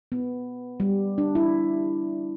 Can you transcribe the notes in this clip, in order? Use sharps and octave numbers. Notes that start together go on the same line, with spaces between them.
B3
G3
D4
E4